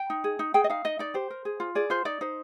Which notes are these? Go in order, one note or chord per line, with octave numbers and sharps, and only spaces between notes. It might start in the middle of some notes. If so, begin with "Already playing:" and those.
Already playing: G5
D#4
G#4
D#4
G#4 G5
D#5
D#4 F5
D#4 D#5
D#4 D5
G4 C5
A#4
G#4
F4
G#4 D5
F4 C5
D#4 D5
D#4 C5